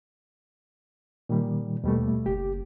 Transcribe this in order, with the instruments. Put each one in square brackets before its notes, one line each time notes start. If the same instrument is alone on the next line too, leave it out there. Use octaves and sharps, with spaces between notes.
[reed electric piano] A#2 D#3 G3
[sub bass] D#2 [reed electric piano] B2 G3 A3
[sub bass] F#1 [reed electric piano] G4